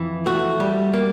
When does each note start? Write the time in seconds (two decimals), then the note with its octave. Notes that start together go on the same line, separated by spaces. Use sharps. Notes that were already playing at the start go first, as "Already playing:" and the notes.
Already playing: F2 E3
0.26 A3 F#4
0.60 G3
0.93 A#3